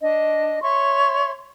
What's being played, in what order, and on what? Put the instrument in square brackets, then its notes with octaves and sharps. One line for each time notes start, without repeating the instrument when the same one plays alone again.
[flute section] D4 D#5
C#5 E5 C6 C#6